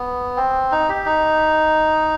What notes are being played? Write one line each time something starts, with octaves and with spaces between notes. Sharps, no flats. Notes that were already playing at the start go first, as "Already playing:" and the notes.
Already playing: B3
C4
D#4
G4
D#4